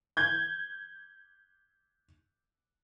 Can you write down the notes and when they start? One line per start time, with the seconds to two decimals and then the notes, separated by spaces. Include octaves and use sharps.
0.17 G6 G#6